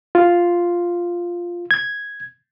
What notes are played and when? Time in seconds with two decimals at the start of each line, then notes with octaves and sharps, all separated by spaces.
0.15 F4
1.71 G#6